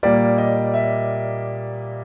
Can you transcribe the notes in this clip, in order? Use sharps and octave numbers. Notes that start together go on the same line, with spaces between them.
A#2 G3 A#3 D5
D#5
E5